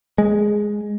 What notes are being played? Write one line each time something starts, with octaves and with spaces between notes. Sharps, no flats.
G#3